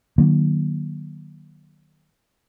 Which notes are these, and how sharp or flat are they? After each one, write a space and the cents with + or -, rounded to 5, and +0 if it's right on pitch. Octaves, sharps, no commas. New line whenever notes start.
D#3 -35 F#3 +10 A#3 +35